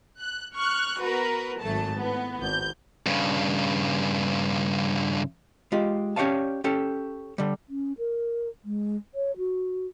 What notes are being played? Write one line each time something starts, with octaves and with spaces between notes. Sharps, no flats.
F#6
C#6 F6 F#6
B3 F#4 A#4 B4
G#1 F#3 A3 A5
A2 B3
G#1 G6
G2 C#3
G#3 F4 G4
C#4 G4 C#5 D5 F5 A5
C#4 G4 A4
D3 G3
C#4
A#4
G#3
C#5
F#4